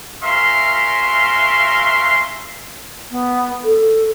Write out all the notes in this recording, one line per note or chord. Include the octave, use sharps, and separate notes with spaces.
C#4 F#4 A#4 E5 F5 C6
B3
A4